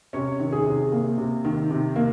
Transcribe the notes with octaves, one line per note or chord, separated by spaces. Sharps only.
C3 C#4 C#5
D#3
G#4
C3
A#3
C3
D#3
C3
A#3